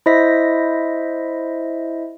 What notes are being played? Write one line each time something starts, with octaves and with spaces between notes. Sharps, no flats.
E4 C5 D#5 E5 A#6 B6